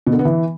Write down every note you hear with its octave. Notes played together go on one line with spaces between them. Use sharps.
B2
D3
B3
E3